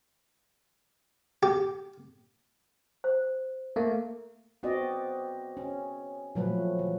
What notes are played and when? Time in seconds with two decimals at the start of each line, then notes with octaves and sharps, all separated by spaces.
1.43 G4
3.04 C5
3.76 A3 A#3
4.63 B3 C4 F#4 D5 D#5
5.57 C#4
6.35 A#2 F3 F#3 A3 B4
6.79 E3